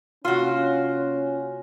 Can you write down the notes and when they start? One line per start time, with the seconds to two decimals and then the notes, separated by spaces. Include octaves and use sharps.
0.25 C3 A#3 C#4 F4 F#4 C6